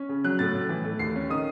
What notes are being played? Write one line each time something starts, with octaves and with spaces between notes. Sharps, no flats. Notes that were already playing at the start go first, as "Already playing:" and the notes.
Already playing: C#4
C#3
F#3 F#6
A2 A6
A2
E3
A3
D#2 C7
C#4
D#3 D#6